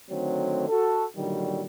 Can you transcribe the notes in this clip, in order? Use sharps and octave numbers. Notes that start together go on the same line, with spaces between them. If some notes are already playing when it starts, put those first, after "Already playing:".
D3 D#3 F#3 A3 C4
F#4 A4
A#2 D3 D#3 F#3 G3